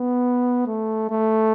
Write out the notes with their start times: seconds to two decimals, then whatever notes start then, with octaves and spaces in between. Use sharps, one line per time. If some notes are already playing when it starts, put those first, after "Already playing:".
Already playing: B3
0.67 A3
1.10 A3